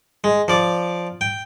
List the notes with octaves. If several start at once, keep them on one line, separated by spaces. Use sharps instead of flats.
G#3
F3 D5 D6
G5